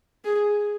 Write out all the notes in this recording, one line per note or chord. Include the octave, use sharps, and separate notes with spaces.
G#4